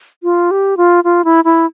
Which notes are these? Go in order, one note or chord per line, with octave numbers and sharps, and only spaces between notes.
F4
G4
F4
F4
E4
E4